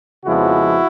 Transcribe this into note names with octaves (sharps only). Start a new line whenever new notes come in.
F2 C#3 F3 G#3 B3 E4 F#4